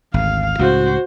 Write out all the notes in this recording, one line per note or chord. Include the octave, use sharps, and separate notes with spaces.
G#1 D2 F5
C#2 A2 C#3 F#4 C5